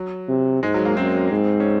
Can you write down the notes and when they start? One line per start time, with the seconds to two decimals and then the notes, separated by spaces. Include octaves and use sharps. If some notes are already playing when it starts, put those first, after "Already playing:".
Already playing: F#3
0.28 C3
0.63 G#2 G#3
0.74 F#3
0.85 A#3
0.97 F#2 C4
1.31 G#2
1.60 C#4